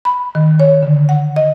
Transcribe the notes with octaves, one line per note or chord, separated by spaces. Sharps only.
B5
D#3
C#5
D3
F#5
D#5